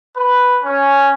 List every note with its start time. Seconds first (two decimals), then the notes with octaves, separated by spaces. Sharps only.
0.16 B4
0.64 C#4